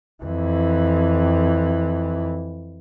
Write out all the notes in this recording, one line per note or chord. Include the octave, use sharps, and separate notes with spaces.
F2 E3